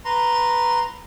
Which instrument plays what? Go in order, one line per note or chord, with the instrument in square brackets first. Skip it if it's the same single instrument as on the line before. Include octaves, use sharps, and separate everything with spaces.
[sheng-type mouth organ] B4 A#5 C6